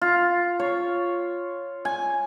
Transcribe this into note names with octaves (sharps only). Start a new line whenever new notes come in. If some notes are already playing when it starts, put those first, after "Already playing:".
F4
C#5
G#5